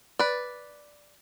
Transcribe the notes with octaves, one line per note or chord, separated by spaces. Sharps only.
B4 D5